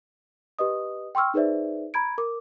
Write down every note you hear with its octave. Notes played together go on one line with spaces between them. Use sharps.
G4 B4 D#5 D#6
G5 C6 C#6 E6 F6
D#4 G#4 B4 C5 D5 E5
A#5 B5 G#6 D7
A#4 D6